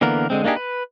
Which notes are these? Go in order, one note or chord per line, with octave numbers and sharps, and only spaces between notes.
D3 E3 A#3 B3 A#4
D3 G#3 C4
A#3 D4 D#4 G4 G#4
B4